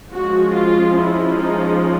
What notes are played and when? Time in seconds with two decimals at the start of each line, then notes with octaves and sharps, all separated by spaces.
0.13 F3 G#3 C#4 F#4
0.54 F4
0.96 E4
1.37 D#4